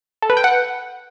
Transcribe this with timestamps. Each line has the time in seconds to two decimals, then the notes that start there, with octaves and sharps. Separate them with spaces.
0.22 A4
0.30 B4
0.37 G5
0.44 F#5